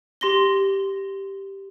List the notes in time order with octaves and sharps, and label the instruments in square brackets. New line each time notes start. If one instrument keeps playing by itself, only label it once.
[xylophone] G4 C6 A#6 G7